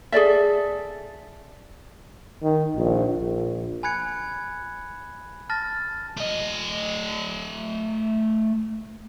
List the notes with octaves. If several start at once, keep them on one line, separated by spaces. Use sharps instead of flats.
G#4 A4 D5 E5
D#3
A#1
A#1
G#5 B5 F#6 G#6 C#7
A5 F6 A6 A#6
A3 D#5